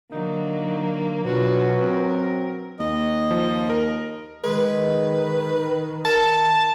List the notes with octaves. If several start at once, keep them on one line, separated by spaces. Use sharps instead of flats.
D3 F#3 A#3 D#4
B2 F#3 D4 F4 F#4 B4
C4 A#4
D#2 D#5
F3
A#4
D#3 G#3 B4
A#4 A5